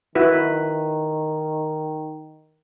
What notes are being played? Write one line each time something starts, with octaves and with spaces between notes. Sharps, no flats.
D#3 E4 F#4 B4